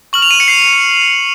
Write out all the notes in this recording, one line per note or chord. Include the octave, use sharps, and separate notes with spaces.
C#6 F6 F#7
F7
D#7
C#7
C7